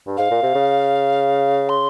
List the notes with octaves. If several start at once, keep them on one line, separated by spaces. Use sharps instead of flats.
G2
G#2 F5
A#2
C3
C#3
C6